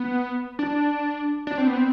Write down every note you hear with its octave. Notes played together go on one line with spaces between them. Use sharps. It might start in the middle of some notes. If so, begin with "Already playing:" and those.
Already playing: B3
D4
D4
C4
B3
C4